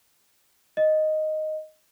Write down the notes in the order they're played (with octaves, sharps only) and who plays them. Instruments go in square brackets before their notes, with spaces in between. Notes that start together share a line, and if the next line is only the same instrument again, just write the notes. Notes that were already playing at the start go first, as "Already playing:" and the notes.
[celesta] D#5